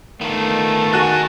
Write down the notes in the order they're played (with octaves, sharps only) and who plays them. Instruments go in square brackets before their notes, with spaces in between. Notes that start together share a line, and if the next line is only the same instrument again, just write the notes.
[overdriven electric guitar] D#3 [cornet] A3 [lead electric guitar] B3 F4
[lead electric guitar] D#4 G#4 [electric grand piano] F#4 F#6 A6